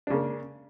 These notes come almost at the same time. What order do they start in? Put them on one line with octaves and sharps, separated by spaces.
D4 C#3 A#3